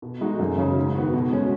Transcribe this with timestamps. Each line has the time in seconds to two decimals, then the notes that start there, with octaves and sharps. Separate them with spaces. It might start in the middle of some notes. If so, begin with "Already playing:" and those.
0.02 B2
0.21 G#3 D#4 F#4
0.39 F#2
0.57 C#3 F#3 D#4
0.77 G#2
0.95 D#3 B3 F#4
1.14 B2
1.32 G#3 C#4 F#4